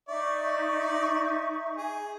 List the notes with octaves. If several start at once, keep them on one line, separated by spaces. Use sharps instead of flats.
D#4 D5 E5 C#6
G#4